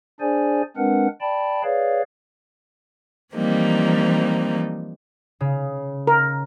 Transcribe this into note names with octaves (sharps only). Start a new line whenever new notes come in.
D4 G#4 C5 D5 G#5
G#3 C4 D4 A#4 B4 F#5
D5 G5 A5 B5
G#4 B4 C#5 D5 F5
E3 F3 G3 A#3 C4 D#4
C#3
A#4